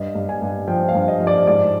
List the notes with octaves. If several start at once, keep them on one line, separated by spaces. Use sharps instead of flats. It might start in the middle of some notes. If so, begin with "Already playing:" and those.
Already playing: G2 D#5
G2
G#5
G2
F3 G5
F5
G2
D#5
F3
D5
G#2 D5